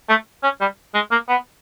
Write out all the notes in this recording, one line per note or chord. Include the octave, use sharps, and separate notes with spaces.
A3
C#4
G3
G#3
A#3
B3